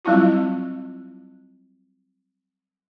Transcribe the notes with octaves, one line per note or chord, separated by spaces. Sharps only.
F#3 G3 C4 E4 F4